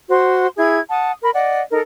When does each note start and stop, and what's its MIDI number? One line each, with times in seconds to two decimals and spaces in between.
0.10 0.48 66
0.10 0.48 72
0.10 0.48 84
0.57 0.79 64
0.57 0.79 68
0.57 0.79 92
0.89 1.12 78
0.89 1.12 81
0.89 1.12 87
1.22 1.30 70
1.22 1.30 83
1.33 1.61 74
1.33 1.61 75
1.33 1.61 78
1.71 1.79 63
1.71 1.79 69
1.71 1.79 70